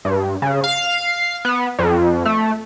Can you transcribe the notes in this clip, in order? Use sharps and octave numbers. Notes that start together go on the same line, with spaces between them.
G2
C#3
F5
B3
F2
A3